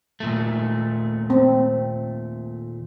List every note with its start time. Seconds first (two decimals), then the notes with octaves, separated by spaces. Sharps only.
0.20 D#2 A#2 A3
1.30 C4